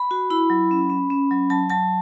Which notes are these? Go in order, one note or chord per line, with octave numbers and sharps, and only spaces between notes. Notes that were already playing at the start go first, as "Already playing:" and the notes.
Already playing: B5
F#4
E4 B5
F#3
C#4
C#4
C#4
F#3
F#3 A5
F#3 A5